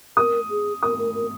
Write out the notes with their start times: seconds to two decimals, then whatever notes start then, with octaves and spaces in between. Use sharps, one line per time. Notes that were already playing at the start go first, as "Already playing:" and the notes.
0.17 A#4 D#6
0.50 G#4
0.82 A#4 D#6
0.99 A#4
1.15 A#4